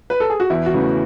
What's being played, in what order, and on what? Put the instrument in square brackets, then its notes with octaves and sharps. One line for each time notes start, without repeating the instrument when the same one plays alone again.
[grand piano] B4
A4
G#4
F#4
E2 E4
F#4
C#3 E3 A3